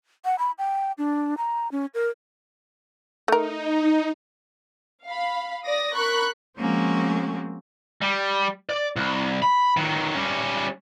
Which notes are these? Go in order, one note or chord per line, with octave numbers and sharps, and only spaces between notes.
F#5
B5
G5
D4
A#5
C#4
A#4
A3 D#4 A#4
F5 B5
D5 D#6 A#6
A#4 B5 C#6 F#6
F3 G#3 A#3 C4 C#4 F#4
G3
D5
C2
B5
D#3 F#3
G3 C#4